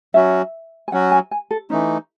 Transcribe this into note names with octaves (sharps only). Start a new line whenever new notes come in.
F#3 C#4 F#4 E5
G#5
F#3 C#4 F#4 F#5
G#5
G#5
A4
E3 A3 C#4 D#4